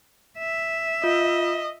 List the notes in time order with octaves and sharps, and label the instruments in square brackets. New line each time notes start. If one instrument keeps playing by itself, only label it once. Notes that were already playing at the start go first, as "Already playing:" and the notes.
[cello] E5
[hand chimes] F4 [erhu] D#5